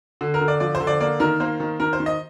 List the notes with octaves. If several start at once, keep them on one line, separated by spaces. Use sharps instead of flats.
D3
A#4
D3
D5
F3 D5
C5
D3
D5
A#3 D5
D#3 A#4
A#3 C5
D#3
D#3 A#4
C5
D#3
D#5